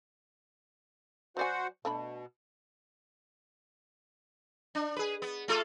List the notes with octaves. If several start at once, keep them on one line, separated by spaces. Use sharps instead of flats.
F#3 F#4 C5 D5 F#5 G#5
B2 A3 D4 B5
D4
G#4 B4
B3
A3 F4 A4